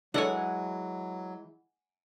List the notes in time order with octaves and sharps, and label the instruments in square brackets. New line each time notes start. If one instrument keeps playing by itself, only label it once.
[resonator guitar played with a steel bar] E3 G#3 [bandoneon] F#3 [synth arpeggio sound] D4 A4 C#5 [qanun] F#5 G#5